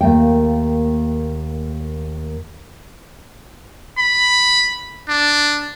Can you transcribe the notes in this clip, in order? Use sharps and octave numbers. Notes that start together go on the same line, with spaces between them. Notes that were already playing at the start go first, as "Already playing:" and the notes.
D#2 A3 A#3 G5
B5
D4